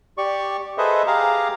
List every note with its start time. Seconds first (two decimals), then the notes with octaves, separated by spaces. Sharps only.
0.18 G4 D5 C#6
0.78 G#4 A4 B4 C5 D#5 E5
1.07 G4 G#4 F5 A#5 D6